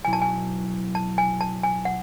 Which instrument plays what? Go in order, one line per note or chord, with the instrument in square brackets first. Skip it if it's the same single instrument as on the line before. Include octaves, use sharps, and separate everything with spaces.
[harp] B2 F#3 C#4 E4 [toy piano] G#5
[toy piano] A5
G#5
A5
G#5
A5
G#5
F#5